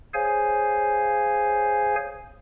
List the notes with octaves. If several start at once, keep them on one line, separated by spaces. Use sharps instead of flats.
G#4 C5 C#5 F5 G#5